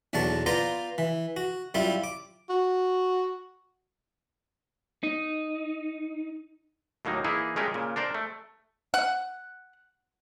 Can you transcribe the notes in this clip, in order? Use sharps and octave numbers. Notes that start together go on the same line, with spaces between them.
B1 E2 F#3 D4 A5 C#6
B3 F4 C5 D5 A#5
E3
F#4
F#2 G3 E4 F4
D6
F#4
D#4
D#2 A2 F#3 A#3 D#4
E3 A#3 D#4 E4 G#4
G#3 A3 C#4 G4 G#4 A#4
A#2 C#3
D4 A#4 C5 D5
A3
F#5